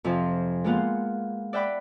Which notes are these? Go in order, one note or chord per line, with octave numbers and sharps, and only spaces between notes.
F2 C3 F3 F4 G#5
G#3 A#3 B3 F4 F5 F#5
D5 E5 F#5 G5 B5 D6